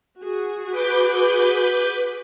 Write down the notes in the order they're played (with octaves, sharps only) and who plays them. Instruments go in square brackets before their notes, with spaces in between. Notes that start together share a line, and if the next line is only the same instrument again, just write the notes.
[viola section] F#4 G#4
[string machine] B4 D6 G6